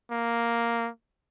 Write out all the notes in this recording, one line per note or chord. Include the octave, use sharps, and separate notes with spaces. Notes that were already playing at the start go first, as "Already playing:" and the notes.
A#3